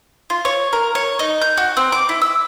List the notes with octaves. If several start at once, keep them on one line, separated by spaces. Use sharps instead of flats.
F4
C#5
A#4
C#5
D#4
G6
F#4
C4
D6
E4
E6